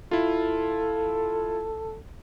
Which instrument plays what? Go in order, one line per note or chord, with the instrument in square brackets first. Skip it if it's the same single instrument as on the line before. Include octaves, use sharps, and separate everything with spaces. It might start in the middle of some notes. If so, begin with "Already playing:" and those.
[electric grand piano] E4 F4 [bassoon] A4